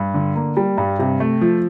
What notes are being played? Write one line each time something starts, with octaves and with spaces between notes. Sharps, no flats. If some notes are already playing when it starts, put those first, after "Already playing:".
Already playing: G2
D3
A#3
G3
G2
C3
A3
F3